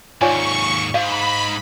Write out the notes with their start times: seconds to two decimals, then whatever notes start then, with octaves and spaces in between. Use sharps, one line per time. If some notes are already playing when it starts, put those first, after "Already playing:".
0.21 D#2 G#2 F4 C#5 D5 G#5 C#6
0.94 G#2 F5 B5